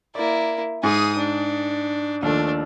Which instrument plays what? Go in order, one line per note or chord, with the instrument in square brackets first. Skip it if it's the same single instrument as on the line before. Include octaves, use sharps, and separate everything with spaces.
[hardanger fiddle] A#3 E4 [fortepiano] D5
[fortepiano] G#2 [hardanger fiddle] G#4 D#6
[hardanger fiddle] D4
[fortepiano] D#2 F3 A3 [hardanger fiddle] D4